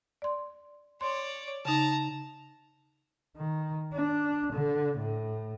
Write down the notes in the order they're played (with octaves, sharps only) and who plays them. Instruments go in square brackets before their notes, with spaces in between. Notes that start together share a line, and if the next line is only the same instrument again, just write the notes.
[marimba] D5 C6
[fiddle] C#5 D5 [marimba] C6
[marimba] C#3 D#4 [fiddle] A5 A#5
[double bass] D#3
D4
D3
A2